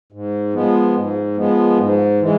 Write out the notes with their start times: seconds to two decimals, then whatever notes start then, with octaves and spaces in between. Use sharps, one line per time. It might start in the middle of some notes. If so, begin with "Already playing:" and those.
0.12 G#2
0.54 F3 G#3 B3
0.95 G#2
1.36 F3 G#3 B3
1.78 G#2
2.20 E3 G#3